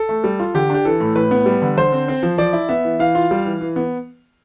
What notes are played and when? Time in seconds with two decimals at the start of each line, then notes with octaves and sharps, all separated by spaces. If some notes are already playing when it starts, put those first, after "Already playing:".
Already playing: A4
0.09 A3
0.24 G3
0.39 F4
0.54 D3 G4
0.70 D4 G4
0.85 E3 A4
1.00 A2
1.16 A2 B4
1.31 B3
1.46 G3
1.62 D3
1.77 D3 C5
1.92 C4
2.08 C4
2.23 F3
2.38 F3 D5
2.53 E4
2.69 B3 E5
2.85 E3
2.99 E3 F5
3.15 F4
3.31 G3
3.45 E3
3.61 E3
3.76 B3